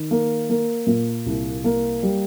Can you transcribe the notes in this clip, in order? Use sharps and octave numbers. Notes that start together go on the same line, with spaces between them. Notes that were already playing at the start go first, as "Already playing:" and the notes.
Already playing: D#3
A#3
A#3
A#2
C2
A#3
G3